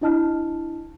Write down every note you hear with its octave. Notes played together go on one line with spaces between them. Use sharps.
D4 E4 D#5 A5 F6